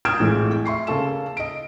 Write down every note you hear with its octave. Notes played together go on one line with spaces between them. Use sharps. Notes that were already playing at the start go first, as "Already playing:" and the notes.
D#6 F6 G6 G#6 D7 E7
A#1 F2 A2 E3 G#3
E5 C6 C#6 C7
C#3 A#3 A4 E7
D#5 D7